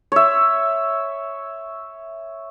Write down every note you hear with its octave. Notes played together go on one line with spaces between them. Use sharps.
C#5 E5